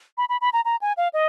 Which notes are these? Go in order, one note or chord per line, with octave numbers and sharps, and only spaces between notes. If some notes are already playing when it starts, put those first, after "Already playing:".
B5
B5
B5
A#5
A#5
G#5
F5
D#5